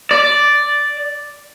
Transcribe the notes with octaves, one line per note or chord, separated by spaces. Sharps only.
D5